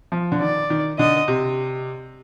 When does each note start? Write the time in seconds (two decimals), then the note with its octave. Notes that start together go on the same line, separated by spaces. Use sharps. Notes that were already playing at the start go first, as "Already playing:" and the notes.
0.12 F3
0.32 D3
0.41 D#3 D5
0.70 D#3
0.99 D3 D#5
1.28 C3